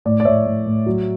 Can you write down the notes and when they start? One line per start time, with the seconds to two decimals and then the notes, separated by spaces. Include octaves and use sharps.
0.05 A2 D5
0.20 D5
0.25 A2 C#5 E5
0.46 A2
0.66 A2
0.86 F#3